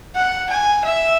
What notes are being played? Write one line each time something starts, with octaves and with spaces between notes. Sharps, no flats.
F#5
G#5
E5